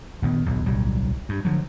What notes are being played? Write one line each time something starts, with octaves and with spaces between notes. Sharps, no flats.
A#1 D#3 B3
D#1 B1
D1 B1 F#3 G3
G2
D3 F3 F#3